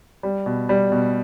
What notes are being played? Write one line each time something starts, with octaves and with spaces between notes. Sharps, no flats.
G3
B2
G3
B2